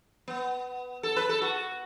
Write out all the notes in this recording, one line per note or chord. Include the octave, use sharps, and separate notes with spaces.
B3
A4
B4
A4
F#4